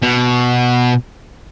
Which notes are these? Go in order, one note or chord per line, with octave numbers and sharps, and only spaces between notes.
B2